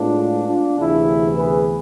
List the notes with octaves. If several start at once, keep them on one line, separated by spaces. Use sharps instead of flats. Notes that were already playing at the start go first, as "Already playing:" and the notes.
Already playing: A2 G#3 B3 D4 F4
D4 F4
D2 C3 E3 B3 E4 G#4
G#4 B4